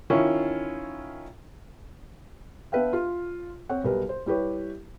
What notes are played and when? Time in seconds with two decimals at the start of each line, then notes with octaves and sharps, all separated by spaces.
0.10 D#3 C#4 E4 F4 C#6
2.72 B3 D4 B4 E5 F5 G5
2.93 F4
3.69 C4 C#5 F#5
3.84 B1 G3 A#4 B4
4.09 C5
4.26 G3 E4 G4 B4 C#5